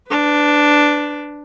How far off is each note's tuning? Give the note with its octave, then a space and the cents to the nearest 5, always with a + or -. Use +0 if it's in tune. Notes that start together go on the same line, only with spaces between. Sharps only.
D4 +0 B4 +25